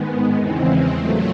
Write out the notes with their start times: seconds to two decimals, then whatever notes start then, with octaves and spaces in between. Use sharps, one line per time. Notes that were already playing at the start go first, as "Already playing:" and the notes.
Already playing: G#2 D#3 G#3 B3
0.35 E2 C#3 E3 G#3 C4
0.91 A#2 F#3 A3